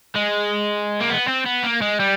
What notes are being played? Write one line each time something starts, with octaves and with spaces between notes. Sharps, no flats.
G#3
A#3
B3
C4
B3
A#3
G#3
G3